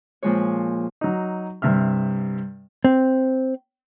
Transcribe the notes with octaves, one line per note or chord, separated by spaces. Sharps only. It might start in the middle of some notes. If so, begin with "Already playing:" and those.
A#2 F3 G#3 C#5
F#3 D#4
G2 C3 E5 F6
C4